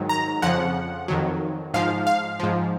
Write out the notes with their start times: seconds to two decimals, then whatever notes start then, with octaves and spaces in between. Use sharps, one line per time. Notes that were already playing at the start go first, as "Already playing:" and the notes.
Already playing: G#2 D#3 F#3
0.09 A#5
0.42 F2 C#3 F3 F#5
1.08 F2 D#3 F#3
1.74 G#2 F3 F5
2.07 F5
2.40 G#2 F3